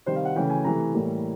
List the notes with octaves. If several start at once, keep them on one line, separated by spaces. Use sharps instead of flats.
C3 D#3 G3 C5
F5
F#5
C#3 E3 A3 G5
G#5
C3 E3 A3 A#5
A2 E3 G3 A#3